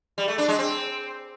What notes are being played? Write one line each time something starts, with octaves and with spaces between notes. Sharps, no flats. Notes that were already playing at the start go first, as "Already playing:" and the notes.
G3
A3
D4
G#3
C4